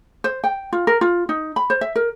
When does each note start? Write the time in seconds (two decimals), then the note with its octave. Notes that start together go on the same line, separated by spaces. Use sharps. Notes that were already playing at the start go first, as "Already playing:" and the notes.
0.24 C5
0.44 G5
0.73 F4
0.87 A#4
1.01 F4
1.29 D#4
1.56 B5
1.70 C5
1.81 E5
1.96 A#4